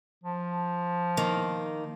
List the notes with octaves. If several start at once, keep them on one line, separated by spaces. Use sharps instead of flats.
F3
D#3 A#3